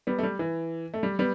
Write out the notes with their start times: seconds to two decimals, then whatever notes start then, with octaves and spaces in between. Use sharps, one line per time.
0.07 G3 B3
0.19 A3
0.23 G3
0.39 E3
0.94 A3
1.03 G3
1.19 G3 B3